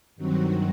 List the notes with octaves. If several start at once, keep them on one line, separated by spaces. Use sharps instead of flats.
G2 D#3 F#3 C4 F#4